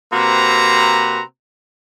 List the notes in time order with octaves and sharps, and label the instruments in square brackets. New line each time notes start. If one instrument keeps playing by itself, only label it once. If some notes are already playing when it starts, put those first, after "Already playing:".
[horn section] C3 A#3 C4 F#4 B4 A#5